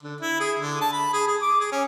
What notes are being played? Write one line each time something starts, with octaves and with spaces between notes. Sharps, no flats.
D3
E4
G#4
D3
A5
B5
G#4
G#4
D6
G#4
C#4